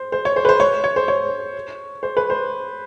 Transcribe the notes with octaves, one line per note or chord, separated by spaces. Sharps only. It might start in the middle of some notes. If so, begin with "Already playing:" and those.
Already playing: C5
C5
C#5
C5
B4
C5
C#5
C#5
C5
C#5
C5
B4
C5